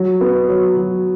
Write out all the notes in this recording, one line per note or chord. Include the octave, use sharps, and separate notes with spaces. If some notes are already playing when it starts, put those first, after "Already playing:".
Already playing: F#3
B3
F#3
F#3